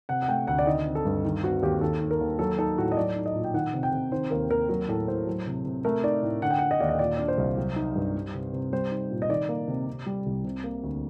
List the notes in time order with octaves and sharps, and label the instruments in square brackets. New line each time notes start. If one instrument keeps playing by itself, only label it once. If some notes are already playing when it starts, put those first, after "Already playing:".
[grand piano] C3 F#5
F#5
A3 G5
D2 F#5
D5
D#3 D#5
C4
A4
G2
D#3
C4 F#4
D#2 G4
D#3 A4
D#4
A#4
D#2
F#3 A4
D#4 A4
A2 F#4
D#5
F#3 D5
D#4
D#5
A#2
G5
D#3 F#5
C3
G5
C3
D#3 C5
D#2 A#4
D#2 A#4
F#3 A#4
A2 A4
A2 C5
F#3
C3
C3
A3 A#4
D#4 D5
A2
D3 F#5
G5
D4 F#5
D#5
D#2 D5
D#5
A#2 D5
D4 D5
C5
C2
F#3
D#4
G2
G3
C3
C3
G3 C5
D#4
A#2
D#5
D#3 D5
A#3
C3
C3
G3
C2
C3
A#3
D2